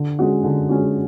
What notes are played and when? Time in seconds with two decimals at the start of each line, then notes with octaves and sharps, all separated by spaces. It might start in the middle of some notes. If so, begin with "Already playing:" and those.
Already playing: D3
0.19 G#3 C#4 F#4
0.44 D3
0.69 G#3 C#4 F#4